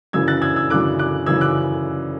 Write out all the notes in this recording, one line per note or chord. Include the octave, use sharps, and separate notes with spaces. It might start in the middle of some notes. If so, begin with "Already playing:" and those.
F#2 C#3 E3 E6 G#6
F#6 A6
E6 G#6
E6 G#6
F#2 C#3 E3 D6 F#6
D6 F#6
F#2 C#3 E3 E6 G#6
D6 F#6